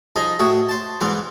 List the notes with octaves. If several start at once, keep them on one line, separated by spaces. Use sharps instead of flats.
F3 D#4 G#4 D#5
A2 F#4 G#4 E5
C5 A5
E2 G#2 E3 B4 C5